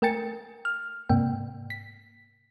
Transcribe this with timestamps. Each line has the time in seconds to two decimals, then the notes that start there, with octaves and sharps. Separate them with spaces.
0.02 A3 A#4 G5 G#5 A6 C#7
0.65 F6
1.09 G#2 C3 A#3 G5
1.70 B6